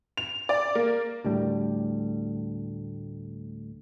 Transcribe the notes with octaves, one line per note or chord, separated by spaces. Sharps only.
F7
D5
A#3
D2 A2 G3